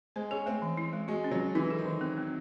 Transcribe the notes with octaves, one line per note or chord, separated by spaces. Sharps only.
G#3 C5
C#4 G#4
A3 C4
E3
E4
G#3
G#3 F#4
C#4
F#3
C#4
E3 D#4
A4
D#3
E3
C4
C4